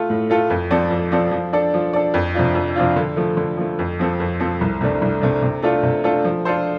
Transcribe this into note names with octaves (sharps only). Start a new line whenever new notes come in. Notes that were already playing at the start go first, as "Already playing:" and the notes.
Already playing: A3 F4 A4
A2
A3 F4 A4
F2
F3 C4 A4 D5
F2
F3 C4 A4 D5
F3
D4 A4 D5
F3
D4 A4 D5
F2
C3 F3 D4 F4
F2
C3 F3 D4 F4
D3
F3 A3
D3
F3 A3
F2
F3 C4 A4
F2
F3 C4 A4
C2
C3 A3 D4
C2
C3 A3 D4
C3
A3 D4 F4 A4
C3
A3 D4 F4 A4
F3
D4 F4 A4 C5